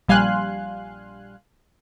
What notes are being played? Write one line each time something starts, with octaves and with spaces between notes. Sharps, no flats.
A#1 G3 F5 G#5 C6 F#6